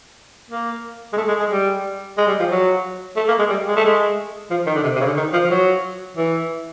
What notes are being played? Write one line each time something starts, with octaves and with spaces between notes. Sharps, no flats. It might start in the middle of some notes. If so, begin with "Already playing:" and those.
A#3
G#3
A3
G#3
G#3
G3
G#3
G3
F3
F#3
A3
A#3
G#3
G3
G#3
A3
G#3
F3
D#3
D3
C3
C3
C#3
D3
D#3
F3
F3
F#3
E3